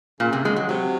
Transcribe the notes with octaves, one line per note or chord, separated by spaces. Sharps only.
A#2 C#3
C3
G#3
F#3
C3 F#3